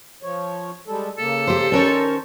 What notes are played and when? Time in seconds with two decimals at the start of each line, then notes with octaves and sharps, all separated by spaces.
0.23 F3 C#5
0.87 G3 G#3 A4
1.18 C#3 A#3 A4
1.47 G4 C5
1.72 D#3 C#4 A#4 C5 C#5 A5